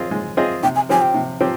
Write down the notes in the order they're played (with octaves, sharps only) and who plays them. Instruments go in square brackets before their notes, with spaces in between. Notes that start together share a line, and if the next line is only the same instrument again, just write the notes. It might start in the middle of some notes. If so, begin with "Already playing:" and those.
Already playing: [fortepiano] C4 F4 G#4 D#5
G#3
C4 F4 G#4 D#5
[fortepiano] C3 [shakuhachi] G5
[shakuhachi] G#5
[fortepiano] F3 C4 G4 [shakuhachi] G#5
[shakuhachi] G5
[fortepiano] C3
F3 C4 G4